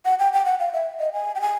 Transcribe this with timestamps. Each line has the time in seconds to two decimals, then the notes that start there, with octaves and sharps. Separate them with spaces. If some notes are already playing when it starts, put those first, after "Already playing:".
0.05 F#5
0.19 G5
0.33 G5
0.45 F#5
0.60 F5
0.73 E5
1.00 D#5
1.13 G#5
1.35 G5
1.41 G#5